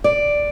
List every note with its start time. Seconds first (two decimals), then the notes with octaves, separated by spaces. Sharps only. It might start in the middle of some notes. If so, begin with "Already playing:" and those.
0.04 D5